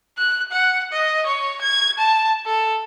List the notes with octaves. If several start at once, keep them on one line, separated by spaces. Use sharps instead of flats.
F#6
F#5
D#5
C#5
G#6
A5
A4